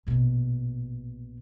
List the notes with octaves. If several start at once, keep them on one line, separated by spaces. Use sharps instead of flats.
A#1 B2